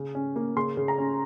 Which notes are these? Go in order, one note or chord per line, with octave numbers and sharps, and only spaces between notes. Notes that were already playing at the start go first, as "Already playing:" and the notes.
Already playing: C#3 C#4
C#4
A#3
C#3 C6
C#3
A#5
C#4